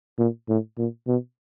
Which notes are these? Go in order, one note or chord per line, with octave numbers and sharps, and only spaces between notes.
A#2
A2
A#2
B2